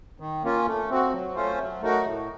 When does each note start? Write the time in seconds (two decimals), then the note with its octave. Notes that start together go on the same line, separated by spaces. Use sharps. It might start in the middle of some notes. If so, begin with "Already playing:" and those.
0.20 D#3
0.43 A#3 C#4 F4
0.67 A3
0.90 C4 F#4
1.13 F#3
1.35 A3 C#4 F4 C5
1.59 F#3
1.82 A3 D#4 F#4 A#4
2.05 A2